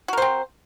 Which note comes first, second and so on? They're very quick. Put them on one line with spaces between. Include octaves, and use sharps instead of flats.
F#4 A#4 C5 C4